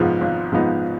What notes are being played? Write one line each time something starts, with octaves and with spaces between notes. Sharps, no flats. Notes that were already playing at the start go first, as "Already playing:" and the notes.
Already playing: G#1 G#2 F3 B3 D#4
G#1
G#2 F3 B3 D#4